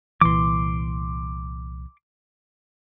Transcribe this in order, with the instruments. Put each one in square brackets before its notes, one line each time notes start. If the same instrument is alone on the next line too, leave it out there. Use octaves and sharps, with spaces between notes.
[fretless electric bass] C2 A#2 E3 [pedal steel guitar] C6 D6